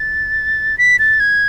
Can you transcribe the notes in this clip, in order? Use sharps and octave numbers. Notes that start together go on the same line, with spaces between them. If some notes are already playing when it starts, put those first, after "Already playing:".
Already playing: A6
B6
A6
G#6